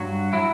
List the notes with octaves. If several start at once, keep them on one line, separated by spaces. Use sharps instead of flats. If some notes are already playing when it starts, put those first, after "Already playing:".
Already playing: G2 F#3 F#4
F#3 E4